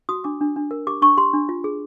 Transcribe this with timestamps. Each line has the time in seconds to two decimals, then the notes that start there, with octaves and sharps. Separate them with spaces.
0.09 F#4 D#6
0.24 D4 D6
0.41 D4
0.56 D4
0.71 A#4
0.87 G4 D6
1.02 D4 C#6
1.18 G4 C6
1.34 D4
1.49 F4
1.64 G#4